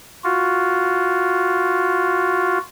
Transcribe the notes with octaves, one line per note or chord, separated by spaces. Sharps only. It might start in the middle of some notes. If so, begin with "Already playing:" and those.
F4 F#4